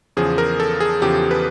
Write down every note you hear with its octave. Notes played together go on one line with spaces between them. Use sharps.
E2 C#3 F3 G#4
A#4
A4
G#4
E2 C#3 F3 G4
B4